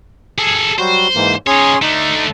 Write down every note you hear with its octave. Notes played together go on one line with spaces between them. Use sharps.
G#4 A4
F#3 G3 F#4 C5
G#2 E3 A#3
C#4 D#4 G#4 C#5 C6
D3 A3 D#4